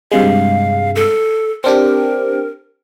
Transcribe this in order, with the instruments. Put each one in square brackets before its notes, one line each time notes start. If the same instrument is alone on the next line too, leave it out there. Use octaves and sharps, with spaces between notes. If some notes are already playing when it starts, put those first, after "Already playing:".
[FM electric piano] G2 C3 G#3 [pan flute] F5
[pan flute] A4
[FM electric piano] C4 D4 G4 [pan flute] A#4